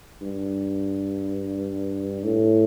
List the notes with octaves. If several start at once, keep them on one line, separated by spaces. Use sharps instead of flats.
G2
A2